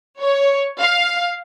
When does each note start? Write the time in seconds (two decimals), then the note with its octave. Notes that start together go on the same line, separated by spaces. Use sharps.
0.21 C#5
0.81 F5